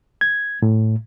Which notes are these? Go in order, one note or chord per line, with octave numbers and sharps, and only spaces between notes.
G#6
A2